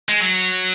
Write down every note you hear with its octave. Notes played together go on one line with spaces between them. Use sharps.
G#3
F#3